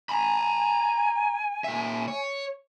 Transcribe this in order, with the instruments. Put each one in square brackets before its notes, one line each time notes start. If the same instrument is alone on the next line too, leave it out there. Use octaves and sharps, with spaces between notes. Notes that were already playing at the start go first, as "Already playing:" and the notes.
[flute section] G#5 [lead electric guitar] A#5 B5
[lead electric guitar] A#2 E5
C#5